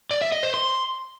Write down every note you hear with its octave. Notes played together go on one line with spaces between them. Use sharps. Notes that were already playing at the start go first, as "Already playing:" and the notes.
D5
E5
D#5
C5
C6